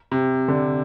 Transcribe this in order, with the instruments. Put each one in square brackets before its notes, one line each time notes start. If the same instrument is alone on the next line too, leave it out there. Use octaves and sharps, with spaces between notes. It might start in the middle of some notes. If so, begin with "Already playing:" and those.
[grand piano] C3
D3